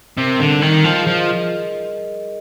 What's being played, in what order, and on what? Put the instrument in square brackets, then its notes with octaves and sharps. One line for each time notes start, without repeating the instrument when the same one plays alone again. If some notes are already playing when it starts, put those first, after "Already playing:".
[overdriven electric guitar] C3 [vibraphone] A#4
[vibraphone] G3
[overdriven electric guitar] D3
[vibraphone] D#4
[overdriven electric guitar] D#3
[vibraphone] A#4
[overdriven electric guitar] F3 [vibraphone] D#5
[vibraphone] G#4
[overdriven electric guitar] F3
[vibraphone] D#5